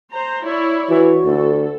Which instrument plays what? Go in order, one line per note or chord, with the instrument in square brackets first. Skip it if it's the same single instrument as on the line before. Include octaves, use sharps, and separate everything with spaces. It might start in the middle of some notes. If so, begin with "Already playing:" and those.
[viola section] C5 A#5
E4 C#5 D5
[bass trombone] E3 [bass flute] F#4
[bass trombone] D2 [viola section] A4